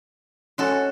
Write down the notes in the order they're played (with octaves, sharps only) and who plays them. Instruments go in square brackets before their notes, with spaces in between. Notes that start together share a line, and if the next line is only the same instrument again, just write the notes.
[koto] G#3 F#4 A4 [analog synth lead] C#4